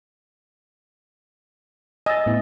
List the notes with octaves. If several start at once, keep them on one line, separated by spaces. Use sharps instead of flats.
D#5 G#5 E6 A6
A2 B3 E4